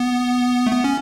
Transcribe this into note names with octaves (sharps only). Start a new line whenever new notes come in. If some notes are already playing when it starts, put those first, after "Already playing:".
Already playing: B3
A3
B3
C#4